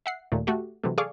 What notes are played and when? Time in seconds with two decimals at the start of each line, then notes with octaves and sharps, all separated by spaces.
0.06 E5 F#5 C7
0.32 D#2 A#2 A3
0.47 A3 F#4 G4
0.84 C3 E3 F#3 A3
0.98 G#4 A4 D5 F5 C#6 D6